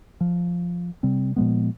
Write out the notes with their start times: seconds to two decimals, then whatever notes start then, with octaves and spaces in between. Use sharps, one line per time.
0.21 F3
1.03 C3 G3 C4
1.36 A#2 F3 G#3 B3